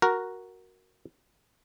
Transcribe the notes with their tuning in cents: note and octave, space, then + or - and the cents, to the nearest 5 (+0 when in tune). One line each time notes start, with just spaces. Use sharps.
F#4 +0 A#4 +0